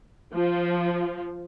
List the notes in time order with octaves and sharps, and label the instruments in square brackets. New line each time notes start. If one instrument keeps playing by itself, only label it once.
[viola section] F3